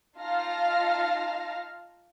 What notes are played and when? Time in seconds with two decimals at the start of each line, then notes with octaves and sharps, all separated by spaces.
0.19 D#4 F4 F5 A5 F6 A#6